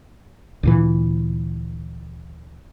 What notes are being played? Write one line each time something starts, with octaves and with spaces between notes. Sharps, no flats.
D2 A#2 E3